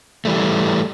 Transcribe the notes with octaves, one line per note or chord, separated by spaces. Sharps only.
E3 G3 A3